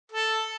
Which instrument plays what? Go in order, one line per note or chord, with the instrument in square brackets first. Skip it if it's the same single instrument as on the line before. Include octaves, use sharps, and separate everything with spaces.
[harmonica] A4